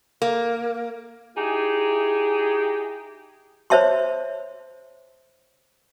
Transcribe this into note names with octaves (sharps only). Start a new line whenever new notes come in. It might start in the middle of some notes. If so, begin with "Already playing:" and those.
A#3
D#4 E4 G4 G#4
C5 C#5 E5 A5 C6